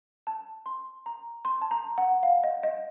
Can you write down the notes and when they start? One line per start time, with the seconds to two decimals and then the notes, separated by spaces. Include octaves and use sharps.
0.27 A5
0.66 C6
1.06 A#5
1.45 C6
1.62 A5
1.71 A#5
1.98 F#5
2.23 F5
2.44 D#5
2.63 D#5